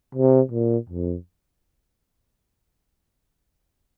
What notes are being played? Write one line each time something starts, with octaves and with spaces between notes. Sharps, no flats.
C3
A#2
F2